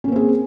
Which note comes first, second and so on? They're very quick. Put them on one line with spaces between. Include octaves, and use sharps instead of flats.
C#4 A#3 C4 G#4